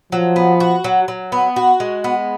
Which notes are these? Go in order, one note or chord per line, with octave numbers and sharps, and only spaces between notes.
F3 F#3
B3
F#4
F#3
F#3
B3
F#4
G#3
B3